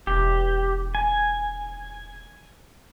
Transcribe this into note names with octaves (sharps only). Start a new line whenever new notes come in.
E1 G4
G#5